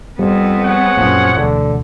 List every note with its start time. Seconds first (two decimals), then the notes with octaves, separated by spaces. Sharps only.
0.19 F2 G3 B3 C4
0.62 G#3 C#5 F#5
0.97 F#2 A#2 F3
1.37 E1 D2 D3